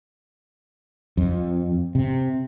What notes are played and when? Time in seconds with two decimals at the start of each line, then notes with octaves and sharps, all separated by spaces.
1.17 F2
1.95 C3